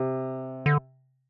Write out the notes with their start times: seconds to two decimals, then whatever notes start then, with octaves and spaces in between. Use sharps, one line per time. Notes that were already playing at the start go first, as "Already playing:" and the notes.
Already playing: C3
0.66 D3